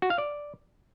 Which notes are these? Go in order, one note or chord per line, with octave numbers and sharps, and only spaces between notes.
F#4
F5
D5